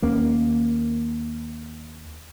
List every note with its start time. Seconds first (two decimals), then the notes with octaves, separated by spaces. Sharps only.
0.02 D#2 A#3 C#4